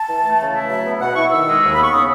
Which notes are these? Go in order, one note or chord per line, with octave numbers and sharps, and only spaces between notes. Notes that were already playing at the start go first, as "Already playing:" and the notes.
Already playing: A5
E3
A3
C#3
E4
F#3 E5
B3
B2 F#5
E4 C#6
D#3 E6
G#3
D#2
B5
B3 C#6
C#3 D#6